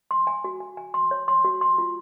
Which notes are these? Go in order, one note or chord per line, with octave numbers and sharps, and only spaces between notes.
C6
G#5
F#4
G#5
G#5
C6
C#5
C6
F#4
C6
F4